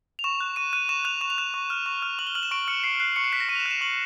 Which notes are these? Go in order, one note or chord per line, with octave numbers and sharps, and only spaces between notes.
F7
C#6 E7
F#6
C#6 D#7
F#6 D#7
C#6 E7
F#6 F7
C#6 E7
F7
F#6 E7
C#6
F6
C#6
F6
C#6 F#7
G7
F6 F#7
E7
C#6 D7
F6 C#7
C#6 C7
F#6 C7
C#6 C#7
C7
F#6 B6
A#6
C#6 D#7
F7
E7
F#6
E7
C#6 F#7